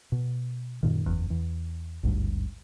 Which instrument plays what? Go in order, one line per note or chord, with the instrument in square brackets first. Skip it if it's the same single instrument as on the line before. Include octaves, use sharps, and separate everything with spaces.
[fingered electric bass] B2
F#2 A#2 D#3
F#1 E2
E2
G#1 D2 G2